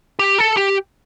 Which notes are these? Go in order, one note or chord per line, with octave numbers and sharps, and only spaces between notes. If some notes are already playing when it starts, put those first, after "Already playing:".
G4
A4
G4